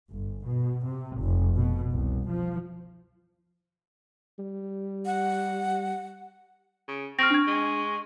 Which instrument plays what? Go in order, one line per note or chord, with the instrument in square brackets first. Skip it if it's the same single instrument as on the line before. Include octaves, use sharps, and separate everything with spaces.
[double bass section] G1
B2
C3
F1
B2
C2
F3
[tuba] G3
[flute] F#5
[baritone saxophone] C#3
[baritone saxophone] C4 [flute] C#6 [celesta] F6 A#6
[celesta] D4 G#6
[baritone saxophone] G#3